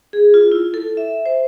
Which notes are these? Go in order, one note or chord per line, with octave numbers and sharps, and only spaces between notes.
G#4
F4
E4
A4
E5
C5